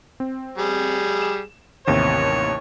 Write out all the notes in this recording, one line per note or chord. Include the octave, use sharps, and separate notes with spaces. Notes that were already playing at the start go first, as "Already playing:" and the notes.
C4
G3 G#4
E7
A1 D#2 C3 C#5